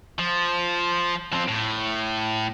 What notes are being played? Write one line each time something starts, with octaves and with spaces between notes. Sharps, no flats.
F3
F3 C4
A2